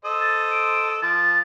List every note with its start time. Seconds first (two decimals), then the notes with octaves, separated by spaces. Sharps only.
0.05 A4 C5 D#5
0.21 A6
0.51 D7
1.02 F3 A6